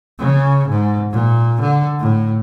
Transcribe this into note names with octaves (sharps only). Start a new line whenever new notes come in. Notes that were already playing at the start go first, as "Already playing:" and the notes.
C#3
G#2
A#2
D3
A2